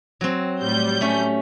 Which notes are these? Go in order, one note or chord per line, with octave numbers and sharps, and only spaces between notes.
F#3 C4
A2 G3 G6
A3 C#4